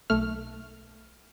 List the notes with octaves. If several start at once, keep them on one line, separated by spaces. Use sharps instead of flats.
B1 A3 F6